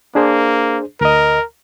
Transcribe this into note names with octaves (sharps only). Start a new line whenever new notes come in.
A#3 D4 G#4 C5
D2 A#4 D#5